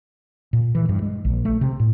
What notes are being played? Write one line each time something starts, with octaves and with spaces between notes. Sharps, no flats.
A#2
E3
G2
G#3
A#1
A3
C3
A2